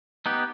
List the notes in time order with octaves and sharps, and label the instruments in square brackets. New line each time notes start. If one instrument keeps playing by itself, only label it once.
[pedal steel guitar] B3 D#4 G4